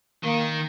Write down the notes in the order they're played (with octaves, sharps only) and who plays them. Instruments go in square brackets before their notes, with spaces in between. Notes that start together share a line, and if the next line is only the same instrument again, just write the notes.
[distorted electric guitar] D#3 [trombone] A#3